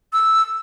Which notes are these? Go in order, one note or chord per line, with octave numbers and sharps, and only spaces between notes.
E6